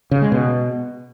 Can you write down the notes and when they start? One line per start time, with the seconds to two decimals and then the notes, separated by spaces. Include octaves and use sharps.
0.11 C#3
0.22 G#3
0.32 B2